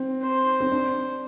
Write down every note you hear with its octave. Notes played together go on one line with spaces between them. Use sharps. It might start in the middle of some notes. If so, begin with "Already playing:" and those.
Already playing: C4
C5
C4
D4